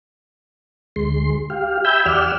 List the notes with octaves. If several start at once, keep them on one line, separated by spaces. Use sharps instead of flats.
D2 G#3 C6
G4 F5
E5 G5 G#5 B5 E6 G6
E2 G4 D5 F#5 E6 F6